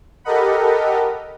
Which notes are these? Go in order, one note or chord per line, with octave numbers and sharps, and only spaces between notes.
G4 A4 A#4 D#5 F#5 B5